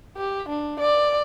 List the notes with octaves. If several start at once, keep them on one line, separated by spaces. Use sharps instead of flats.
G4
D4
D5